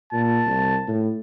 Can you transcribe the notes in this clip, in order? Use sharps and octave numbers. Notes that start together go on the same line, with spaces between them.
A#2 A5
C2
A2